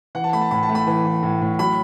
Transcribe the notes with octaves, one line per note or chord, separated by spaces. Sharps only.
E3 F#5
A5
A3 B5
A5
A2 B5
A5
A3
B5
E3
E3
A2
A2
F#3 B5